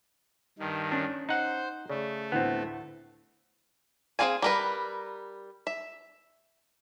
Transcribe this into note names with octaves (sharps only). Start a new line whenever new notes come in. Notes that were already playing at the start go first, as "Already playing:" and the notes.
G2 D#3
C#4 D4
D#4 C5 F#5
C#3 A3 D5
D2 A2 B3 C4 F#5
C4 F4 G#4 F5 G#5
G3 A#4 B4
E5